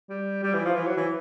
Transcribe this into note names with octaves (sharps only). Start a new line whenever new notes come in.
G3
G3
E3
F3
E3
F#3
E3